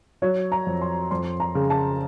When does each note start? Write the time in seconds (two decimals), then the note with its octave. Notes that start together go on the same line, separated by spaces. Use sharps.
0.22 F#3 C#5
0.52 A#5
0.66 F2
0.81 C6
1.11 F2 C6
1.40 A#5
1.55 C#3
1.70 A5